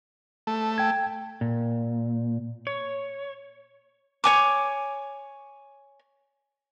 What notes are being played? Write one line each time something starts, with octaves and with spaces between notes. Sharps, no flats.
A3
G5 G#6
A#2
C#5
C#5 G#5 D6